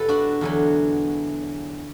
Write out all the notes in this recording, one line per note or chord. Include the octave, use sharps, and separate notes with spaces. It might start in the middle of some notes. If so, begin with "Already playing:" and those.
Already playing: E2 B2 G3 B3 A4 B4
D4 F#4
E2 D3 F#3